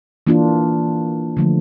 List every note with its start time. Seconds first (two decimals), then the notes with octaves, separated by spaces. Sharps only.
0.27 E3 A#3 D4 F4
1.37 D3 F3 A3